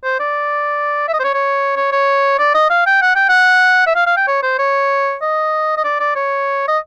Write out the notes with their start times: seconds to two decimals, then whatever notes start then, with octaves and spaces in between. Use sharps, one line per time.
0.04 C5
0.20 D5
1.08 E5
1.14 D#5
1.19 C5
1.24 C#5
1.34 C#5
1.76 C#5
1.92 C#5
2.39 D5
2.54 D#5
2.70 F5
2.86 G5
3.02 F#5
3.16 G5
3.29 F#5
3.87 E5
3.96 F5
4.07 F5
4.17 G5
4.28 C#5
4.43 C5
4.59 C#5
5.22 D#5
5.77 D#5
5.84 D5
6.00 D5
6.15 C#5
6.68 D#5